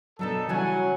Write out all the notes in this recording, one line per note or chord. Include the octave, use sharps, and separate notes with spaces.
B2 D3 F#3 D#4 A4
C#3 E3 F#3 G3 F#5 G#5